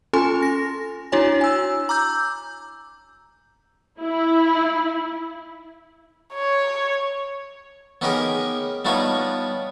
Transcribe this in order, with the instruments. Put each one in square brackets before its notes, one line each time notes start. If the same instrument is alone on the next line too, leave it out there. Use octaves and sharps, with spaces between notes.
[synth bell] C#4 F4 A4 G#5 C6
A#6
D4 E4 F#4 C#5 G#5
G#5 E6
A#5 D6 E6 G6
[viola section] E4
[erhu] C#5
[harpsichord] B3 C#4 D#4 G4 G#4 A#4
G3 B3 D4 D#4 F4 C#5